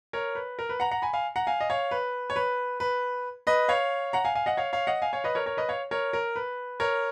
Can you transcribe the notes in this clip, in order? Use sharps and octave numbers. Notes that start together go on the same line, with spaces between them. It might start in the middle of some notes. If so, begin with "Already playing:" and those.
A#4 C#5
B4
A#4
B4
F#5 A#5
F#5 A#5
G#5 B5
F5 G#5
F#5 A#5
F5 G#5
D#5
C#5 F5
B4
C#5
B4
B4
B4 D#5
C#5 F5
F#5 A#5
F5 G#5
F5 G#5
D#5 F#5
C#5 F5
C#5 F5
D#5 F#5
F5 G#5
C#5 F5
B4 D#5
A#4 C#5
A#4 C#5
B4 D#5
C#5 F5
A#4 C#5
A#4
B4
A#4 C#5